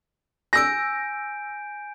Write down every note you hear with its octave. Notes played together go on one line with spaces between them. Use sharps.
G#5 E6 G6 A#6 D7